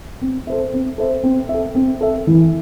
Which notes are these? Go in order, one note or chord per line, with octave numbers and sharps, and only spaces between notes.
C4
A4 C5 E5
C4
A4 C5 E5
C4
A4 E5
C4
A4 E5
E3